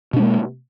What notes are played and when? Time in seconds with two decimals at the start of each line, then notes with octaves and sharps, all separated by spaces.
0.13 B2
0.16 D4
0.19 G#3
0.23 A#3